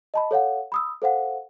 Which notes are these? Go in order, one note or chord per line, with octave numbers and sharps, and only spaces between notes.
D#5 A5 B5
A4 C#5 F5 F#5
B5 D#6 E6
A4 C5 F5 F#5